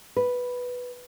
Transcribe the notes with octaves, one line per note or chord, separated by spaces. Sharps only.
B4